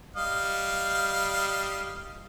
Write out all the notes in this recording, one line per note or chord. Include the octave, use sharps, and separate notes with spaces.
G3 D#5 F5